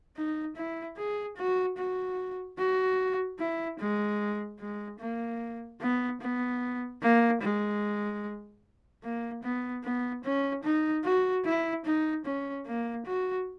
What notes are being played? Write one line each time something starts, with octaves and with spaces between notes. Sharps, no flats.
D#4
E4
G#4
F#4
F#4
F#4
E4
G#3
G#3
A#3
B3
B3
A#3
G#3
A#3
B3
B3
C#4
D#4
F#4
E4
D#4
C#4
A#3
F#4